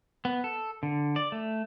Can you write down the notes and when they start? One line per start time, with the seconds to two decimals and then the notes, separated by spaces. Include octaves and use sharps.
0.25 B3
0.44 A4
0.83 D3
1.16 D5
1.32 A3